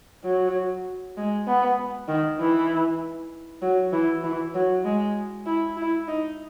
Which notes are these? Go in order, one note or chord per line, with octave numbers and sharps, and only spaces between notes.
F#3
G#3
B3
D#3
E3
F#3
E3
E3
F#3
G#3
E4
E4
D#4